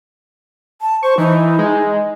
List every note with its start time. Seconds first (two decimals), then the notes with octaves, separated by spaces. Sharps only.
0.81 A5
1.03 C5 C#6
1.18 E3 D#4
1.59 G#3